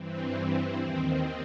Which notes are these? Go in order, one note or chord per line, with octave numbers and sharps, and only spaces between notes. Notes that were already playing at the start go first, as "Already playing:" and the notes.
Already playing: G2 E3 C4
G2 E3 C4
D#2 D#3